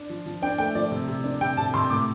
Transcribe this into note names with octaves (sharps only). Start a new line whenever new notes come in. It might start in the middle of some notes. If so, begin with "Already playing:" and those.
Already playing: D4
F3
F3
D4 G5
A3 G5
F3 D5
C3
C3
D4
C3 G5
C3 A5
C3 C6
A2 D6